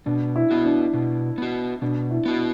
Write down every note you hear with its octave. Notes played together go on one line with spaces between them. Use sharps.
B2 D4
E4
B3 F#4
D4
B2
B3 F#4
B2 D4
E4
B3 F#4